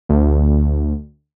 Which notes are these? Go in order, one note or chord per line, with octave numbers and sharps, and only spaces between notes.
D2